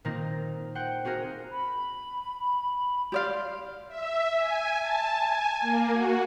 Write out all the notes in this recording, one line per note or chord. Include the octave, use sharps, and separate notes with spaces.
A#2 D#3 A#3 C4 D#4 A#4
C5 F#5 G5
C4 F#4 G#4 A#4 F5
B5
G4 D5 F5 C6
E5
G#5
A5
G#5
A#3
F#4